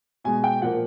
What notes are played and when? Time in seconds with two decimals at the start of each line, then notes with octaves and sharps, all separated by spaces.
0.24 B2 G#3 G#5
0.44 G5
0.62 A#2 F3 A#3 F#5